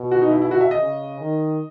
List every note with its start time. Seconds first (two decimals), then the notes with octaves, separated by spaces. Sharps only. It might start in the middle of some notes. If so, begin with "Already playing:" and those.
Already playing: B2
0.11 F#4
0.22 D#4
0.31 E4
0.42 E4
0.51 F#4
0.61 E5
0.71 D#5
0.81 C#3
1.21 D#3